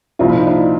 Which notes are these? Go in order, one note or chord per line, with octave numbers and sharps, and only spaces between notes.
C2 A#2 F3 F4
E4
D#4
D4 E4